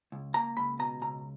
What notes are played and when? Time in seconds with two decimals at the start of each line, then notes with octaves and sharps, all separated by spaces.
0.12 C#2
0.34 A#3 A#5
0.57 C#2 B5
0.79 B2 A#5
1.02 C#2 A#5